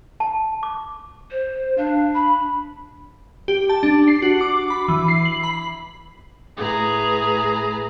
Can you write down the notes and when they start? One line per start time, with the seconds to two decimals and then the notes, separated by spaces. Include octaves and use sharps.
0.20 A5
0.63 D6
1.31 C5
1.78 D4 F5
2.15 B5
3.48 G4
3.69 A5
3.83 D4
4.08 C7
4.22 F#4
4.41 D6
4.70 B5
4.88 E3
5.08 C7
5.25 F#7
5.43 B5
6.56 A2 G#4 B4 A#5